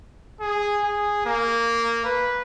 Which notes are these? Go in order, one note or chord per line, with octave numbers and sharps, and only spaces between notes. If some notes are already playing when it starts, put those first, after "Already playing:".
G#4
G#4
A#3
B4